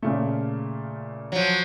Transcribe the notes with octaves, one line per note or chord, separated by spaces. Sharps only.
A#2 C#3 A3
F3 F#3